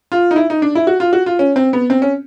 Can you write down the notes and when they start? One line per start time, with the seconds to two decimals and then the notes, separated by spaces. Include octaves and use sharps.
0.12 F4
0.31 D#4
0.36 E4
0.50 D#4
0.62 D4
0.75 E4
0.87 F#4
1.00 F4
1.13 F#4
1.26 F4
1.39 C#4
1.56 C4
1.73 B3
1.90 C4
2.02 C#4